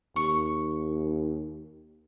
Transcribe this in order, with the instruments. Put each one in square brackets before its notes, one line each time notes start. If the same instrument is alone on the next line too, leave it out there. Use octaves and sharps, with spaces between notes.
[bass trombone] D#2 [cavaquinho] C#6